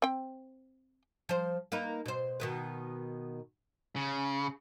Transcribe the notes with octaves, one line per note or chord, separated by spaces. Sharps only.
C4 G5
F3 C5
A#3 D#4 B4
B2 C5
B2 D#3 B3
C#3